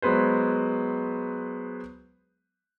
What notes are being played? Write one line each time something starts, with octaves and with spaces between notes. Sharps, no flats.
F#3 G#3 B3 B4 C5